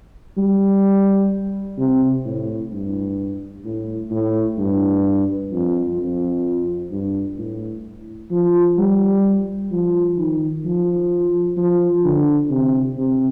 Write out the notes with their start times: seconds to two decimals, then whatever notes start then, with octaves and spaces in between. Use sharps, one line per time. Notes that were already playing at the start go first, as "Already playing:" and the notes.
0.38 G3
1.79 C3
2.25 A2
2.72 G2
3.65 A2
4.11 A2
4.59 G2
5.52 F2
5.99 F2
6.92 G2
7.38 A2
8.31 F3
8.78 G3
9.72 F3
10.18 D#3
10.65 F3
11.57 F3
12.04 D3
12.50 C3
12.97 C3